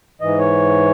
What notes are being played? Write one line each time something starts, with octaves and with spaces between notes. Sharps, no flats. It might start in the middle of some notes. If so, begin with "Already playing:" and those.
G#2 E3 D#5
C#5